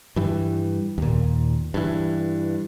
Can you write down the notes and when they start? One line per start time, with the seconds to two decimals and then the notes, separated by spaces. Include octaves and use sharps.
0.16 G2 E3 G3
0.98 D#2 A#2
1.74 G2 E3